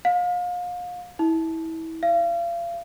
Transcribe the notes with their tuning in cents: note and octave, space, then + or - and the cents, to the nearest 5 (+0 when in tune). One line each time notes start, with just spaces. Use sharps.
F5 +35
E4 -25
F5 -35